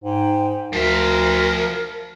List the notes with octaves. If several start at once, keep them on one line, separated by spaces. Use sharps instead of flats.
G#2 G5
D2 F3 A#4 E5